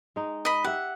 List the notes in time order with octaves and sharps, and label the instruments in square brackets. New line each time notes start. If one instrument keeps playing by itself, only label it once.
[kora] G#3 D#4
[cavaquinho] D#5 B5
[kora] G4 E5 [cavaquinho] F#5